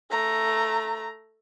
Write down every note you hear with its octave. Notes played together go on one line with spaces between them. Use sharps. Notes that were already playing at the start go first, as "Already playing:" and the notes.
A3 A#5